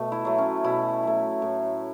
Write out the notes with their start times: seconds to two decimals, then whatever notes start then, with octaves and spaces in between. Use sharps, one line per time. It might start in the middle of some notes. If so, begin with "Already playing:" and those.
Already playing: B2 A3
0.12 E4
0.25 F#3 A3
0.38 C#4
0.64 B2 E4
1.03 F#3 A3
1.42 A2